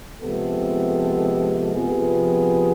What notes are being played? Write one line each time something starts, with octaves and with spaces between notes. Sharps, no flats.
C3 F3 G#3 B3 A4
C3 F3 B3 G#4